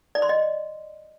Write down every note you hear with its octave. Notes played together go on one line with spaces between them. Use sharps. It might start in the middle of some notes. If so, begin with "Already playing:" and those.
D5
C6
D#5